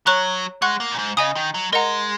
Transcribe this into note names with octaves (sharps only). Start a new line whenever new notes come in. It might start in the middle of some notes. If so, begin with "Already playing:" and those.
F#3 C#5 A#5 C#6 F#6
G#3 F#5 C#6 F#6
A#3
A#2
G#2
C#3 D#5 G#5 D#6
D#3
F#3
G#3 A#4 D#5 F#5 A#5